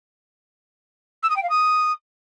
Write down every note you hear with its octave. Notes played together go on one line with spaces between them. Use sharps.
E6
D#6
G5
F5
D#6